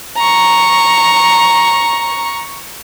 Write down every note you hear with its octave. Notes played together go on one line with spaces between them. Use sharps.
A#5 C#6